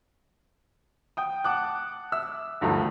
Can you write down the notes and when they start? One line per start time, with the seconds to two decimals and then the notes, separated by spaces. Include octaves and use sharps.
1.17 G5 D#6
1.44 F#5 A5 D6 F#6
2.12 E5 E6
2.61 D2 G2 D#3 F3 A3 A#5